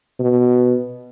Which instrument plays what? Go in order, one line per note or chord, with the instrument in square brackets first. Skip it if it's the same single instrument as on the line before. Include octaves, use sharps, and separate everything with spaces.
[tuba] B2